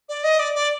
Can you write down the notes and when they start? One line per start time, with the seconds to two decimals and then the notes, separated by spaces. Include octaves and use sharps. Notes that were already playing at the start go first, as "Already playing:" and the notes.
0.09 D5
0.24 D#5
0.39 D5
0.55 D5